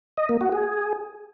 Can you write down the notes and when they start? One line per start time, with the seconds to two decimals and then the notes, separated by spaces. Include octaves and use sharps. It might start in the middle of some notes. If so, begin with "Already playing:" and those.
0.17 D#5
0.29 A#3
0.41 F#4
0.52 G#4